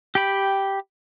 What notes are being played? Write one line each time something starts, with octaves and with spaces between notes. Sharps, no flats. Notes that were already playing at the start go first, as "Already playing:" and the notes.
G4 G5 B5